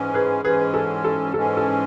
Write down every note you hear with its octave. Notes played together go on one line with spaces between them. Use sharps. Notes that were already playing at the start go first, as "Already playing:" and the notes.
Already playing: G#2 E3 G#3 C#4
G#4 B4
G#2 E3 G#3 C#4 G#4 B4
A4
A4
G#2 E3 G#3 C#4 A4
A4